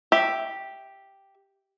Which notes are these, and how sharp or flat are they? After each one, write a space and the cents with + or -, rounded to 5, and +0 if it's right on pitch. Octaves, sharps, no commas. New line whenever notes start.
G4 +0 E5 +0